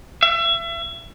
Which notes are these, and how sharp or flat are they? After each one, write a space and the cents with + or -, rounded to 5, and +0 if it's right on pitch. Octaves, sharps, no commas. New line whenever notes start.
E5 +35